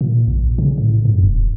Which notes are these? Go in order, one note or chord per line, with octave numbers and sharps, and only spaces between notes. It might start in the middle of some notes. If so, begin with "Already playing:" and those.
A#2
A#1
C#3
A2
F#2
D#1